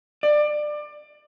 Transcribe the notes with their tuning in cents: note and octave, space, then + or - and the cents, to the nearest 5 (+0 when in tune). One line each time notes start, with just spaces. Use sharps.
D5 +25